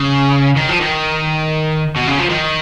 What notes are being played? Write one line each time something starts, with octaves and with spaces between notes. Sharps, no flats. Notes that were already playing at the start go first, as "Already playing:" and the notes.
Already playing: C#3
D#3
F3
D#3
B2
C#3
F3
D#3